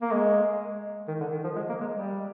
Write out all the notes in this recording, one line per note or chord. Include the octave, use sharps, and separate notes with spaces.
A#3
G#3
D#3
D3
D#3
F3
G#3
A#3
G#3
G3